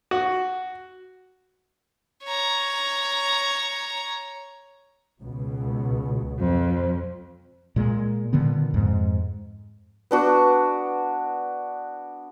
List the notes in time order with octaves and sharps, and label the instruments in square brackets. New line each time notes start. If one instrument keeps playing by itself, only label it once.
[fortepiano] F#4
[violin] C#5 A#5
[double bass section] C#2 B2
[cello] F2
[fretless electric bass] A#2 G#3
A#2 D3 D#3 B3
F2 G#2
[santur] B3 D4 F#4